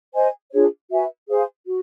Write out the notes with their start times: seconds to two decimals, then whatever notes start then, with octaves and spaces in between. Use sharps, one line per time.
0.14 C5 D#5 G#5
0.52 D4 F4 G#4 C#5
0.90 F#4 B4 E5 G#5
1.29 G#4 C5 F5 G#5
1.67 F#4